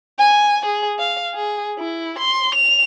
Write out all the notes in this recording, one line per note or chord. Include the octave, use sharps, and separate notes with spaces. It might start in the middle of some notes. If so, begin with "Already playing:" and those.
G#5
G#4
F5
G#4
E4
C6
F7